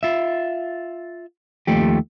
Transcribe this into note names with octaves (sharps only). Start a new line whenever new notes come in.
F4 E5
D#2 F3 A3 G4